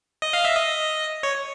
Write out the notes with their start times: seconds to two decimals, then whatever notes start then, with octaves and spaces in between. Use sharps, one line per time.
0.22 D#5
0.33 F5
0.45 E5
0.56 D#5
1.23 C#5